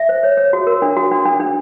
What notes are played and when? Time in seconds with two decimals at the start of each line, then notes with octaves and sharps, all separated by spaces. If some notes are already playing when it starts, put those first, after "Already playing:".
Already playing: E5
0.09 C5
0.23 C#5
0.37 C#5
0.53 F#4
0.67 A#4
0.82 D4
0.97 F#4
1.12 D4
1.25 D4
1.40 D4